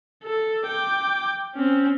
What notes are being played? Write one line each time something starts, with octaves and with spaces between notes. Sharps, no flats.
A4
G5 D6
C4 C#4